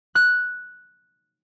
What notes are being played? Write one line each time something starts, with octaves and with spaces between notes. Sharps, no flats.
F#6